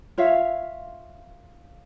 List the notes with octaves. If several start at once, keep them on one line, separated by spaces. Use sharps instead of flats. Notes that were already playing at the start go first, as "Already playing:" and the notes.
F4 C#5 E5 F5